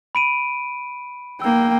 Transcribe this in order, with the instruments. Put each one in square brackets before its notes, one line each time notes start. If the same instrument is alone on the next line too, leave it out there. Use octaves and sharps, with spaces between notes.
[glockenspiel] B5 D7 D#7
[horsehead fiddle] A#3 G5 [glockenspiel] E6